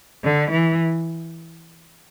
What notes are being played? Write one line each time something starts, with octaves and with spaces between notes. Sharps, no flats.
D3
E3